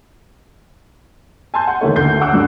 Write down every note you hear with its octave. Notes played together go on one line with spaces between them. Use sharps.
G#5 A5 C6 G6
F#5
D#2 E3 A3 A#3 C#5
D2 G6 C7
F#5 D6 E6 F#6
G2 F#3 D4